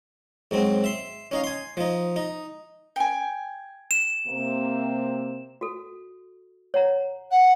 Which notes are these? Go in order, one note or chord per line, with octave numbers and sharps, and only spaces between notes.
G#2 F#3 C4
E5 C6
C#4 D#4 F5
G#5 C6
F3 D#4
D#4
G5 G#5
E7
C3 A#3 C4
F#4 A4
C#5 F#5 A#5
F#5